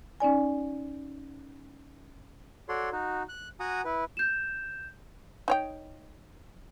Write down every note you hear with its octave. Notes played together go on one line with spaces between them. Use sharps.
C#4 D#4 D5 G#5
F#4 A4 C#5 D5 C6
D#4 F#4
F#6
F#4 F#5 G#5 A#5 D#6
E4 B4
G6 E7
D#4 C#5 G5